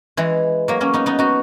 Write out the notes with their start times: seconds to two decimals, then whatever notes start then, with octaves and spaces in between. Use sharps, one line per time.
0.17 E3 G#3
0.68 F#3 A#3
0.81 A#3 C#4
0.94 B3 D#4
1.06 B3 D#4
1.19 D#4 F#4